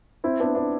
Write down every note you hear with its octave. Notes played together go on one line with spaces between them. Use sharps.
C4 E4
B3 D4
B3 D4